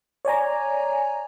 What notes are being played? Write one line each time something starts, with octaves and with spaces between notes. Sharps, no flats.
C#5 D5 G#5 A#5